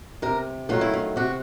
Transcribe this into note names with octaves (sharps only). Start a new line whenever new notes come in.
C3 A#4
D#3 F#3 A3 F4
E4
F4
C3 F#4